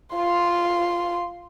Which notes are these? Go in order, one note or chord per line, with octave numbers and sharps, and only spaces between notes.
F4 C6